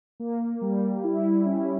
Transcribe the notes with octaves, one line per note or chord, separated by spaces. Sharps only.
A#3
G3
E4
C#4